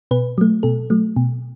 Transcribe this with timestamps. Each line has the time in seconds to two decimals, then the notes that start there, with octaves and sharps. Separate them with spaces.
0.11 B2 B4
0.38 F#3 A3
0.63 B2 A4
0.90 F#3 A3
1.16 B2